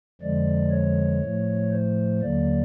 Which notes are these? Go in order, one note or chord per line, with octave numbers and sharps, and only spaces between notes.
F2 D3 F3 G#3 D5
C#5
A2 F3 A3
C5
D#2 D3 F#3 A#3 D5